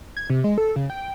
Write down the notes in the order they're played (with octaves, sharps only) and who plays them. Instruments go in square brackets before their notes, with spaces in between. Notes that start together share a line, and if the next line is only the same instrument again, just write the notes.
[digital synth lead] G#6
C3
G#3
A4
C#3
G5